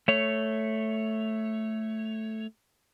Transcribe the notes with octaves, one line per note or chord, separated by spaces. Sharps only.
A3 C#5